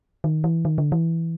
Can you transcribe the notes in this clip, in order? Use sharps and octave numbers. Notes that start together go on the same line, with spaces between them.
D#3
E3
D#3
D3
E3